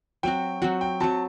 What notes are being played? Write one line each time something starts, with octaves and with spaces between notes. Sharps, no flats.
F#3 C4 F#4 G5
F#3 C4 F#4 F#5
G5
F#3 C4 F#4 A5